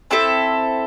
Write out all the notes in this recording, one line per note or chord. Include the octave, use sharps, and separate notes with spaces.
C4 E4 A4 E5